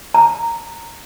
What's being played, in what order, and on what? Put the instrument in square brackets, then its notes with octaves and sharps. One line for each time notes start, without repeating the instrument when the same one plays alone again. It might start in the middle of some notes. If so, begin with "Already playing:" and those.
[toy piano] A#5